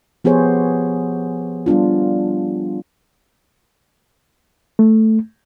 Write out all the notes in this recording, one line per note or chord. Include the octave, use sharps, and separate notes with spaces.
F3 B3 G4 G#4 C5 C#5
G3 B3 D4 F4
A3